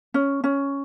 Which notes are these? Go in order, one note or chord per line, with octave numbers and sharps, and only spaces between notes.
C#4
C#4